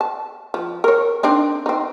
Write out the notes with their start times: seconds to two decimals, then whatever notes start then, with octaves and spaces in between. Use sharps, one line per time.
0.01 A5
0.54 F3
0.84 A#4 C#5
1.23 C4 D4 D#4
1.66 C4 D#4